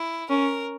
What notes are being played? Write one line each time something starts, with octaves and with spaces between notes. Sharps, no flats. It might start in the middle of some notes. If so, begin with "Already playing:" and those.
Already playing: E4
C#4 A#4